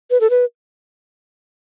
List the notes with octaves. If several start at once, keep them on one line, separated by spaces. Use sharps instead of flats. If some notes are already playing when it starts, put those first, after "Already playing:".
B4
A4
B4